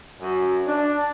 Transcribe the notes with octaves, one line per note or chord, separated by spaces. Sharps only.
F#2
D4